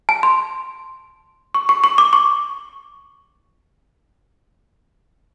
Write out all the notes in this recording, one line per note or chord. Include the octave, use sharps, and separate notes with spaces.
A5
C6
C#6
C#6
C#6
D6
C#6